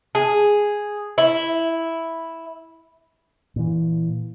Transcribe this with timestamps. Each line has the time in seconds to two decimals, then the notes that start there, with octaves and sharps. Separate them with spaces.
0.15 G#4
1.18 E4
3.56 A#2 E3